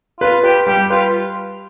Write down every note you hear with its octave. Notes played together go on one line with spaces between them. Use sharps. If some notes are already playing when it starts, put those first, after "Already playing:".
F4 B4
G4 B4
G3 G4
F4 B4